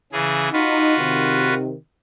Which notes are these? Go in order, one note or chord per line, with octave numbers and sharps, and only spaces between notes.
C#3 E3 G#4
D#4 F4 F#4 B4
C3 D#3